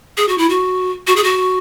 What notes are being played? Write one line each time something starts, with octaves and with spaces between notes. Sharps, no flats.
G#4
F#4
E4
F#4
F#4
G#4
F#4